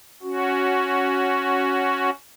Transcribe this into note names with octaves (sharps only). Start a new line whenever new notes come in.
C#4 F#4